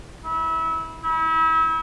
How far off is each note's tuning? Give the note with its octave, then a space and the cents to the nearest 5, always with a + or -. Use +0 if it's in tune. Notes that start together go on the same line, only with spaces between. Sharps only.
E4 -25
E4 -35